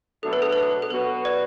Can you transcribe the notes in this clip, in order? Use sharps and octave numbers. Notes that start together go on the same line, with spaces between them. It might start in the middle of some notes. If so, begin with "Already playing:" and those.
B2 F#3 A3 D4 A4
B4
A4
B4
A4
A4
B2 F#3 B3 F#4 B4
D5